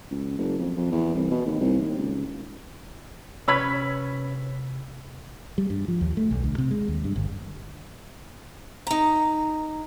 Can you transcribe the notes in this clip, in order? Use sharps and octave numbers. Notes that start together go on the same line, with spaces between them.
C#2
F#1
F2
F2
E2
C2
B2
D#2
C2
D#2
C#2
C3 C#4 B4 B5 E6 G#6 B6
G3
G2
F3
D#2
A3
B1
D2
C3
G#3
D#2
G2
G1
D#4 A#5